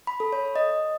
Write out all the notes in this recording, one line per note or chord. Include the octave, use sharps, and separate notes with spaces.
B5
A4
C#5
D#5